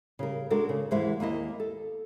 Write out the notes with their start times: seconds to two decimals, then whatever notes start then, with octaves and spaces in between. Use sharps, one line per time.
0.19 C#3 G3 A#4
0.50 G#3 D4 F#4 A4 A#4
0.69 C#3
0.91 D#2 G#2 E3 G#3 C5 E5
1.20 D#2 A#3 E4 D#5
1.60 A4